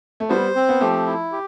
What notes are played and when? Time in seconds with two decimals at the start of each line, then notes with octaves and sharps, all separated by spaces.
0.20 A3
0.29 G3 B3 C5
0.55 C4
0.69 B3
0.81 F3 A3 G4
1.06 E4
1.32 G4